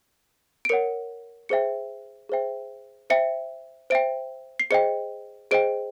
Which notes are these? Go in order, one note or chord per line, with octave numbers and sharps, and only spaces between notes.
D7
A#4 C#5 F#5 C#7
G#4 C5 E5 G5 C#7
G#4 C5 E5 G5
C5 E5 G5 C#7
C5 E5 G5 D7
C7
G#4 C5 D#5 G5 C#7
G#4 C5 D#5 G5 D7